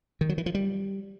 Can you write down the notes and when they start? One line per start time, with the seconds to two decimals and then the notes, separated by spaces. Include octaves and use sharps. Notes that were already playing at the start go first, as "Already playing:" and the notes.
0.21 D#3
0.29 F#3
0.38 E3
0.46 F3
0.55 G3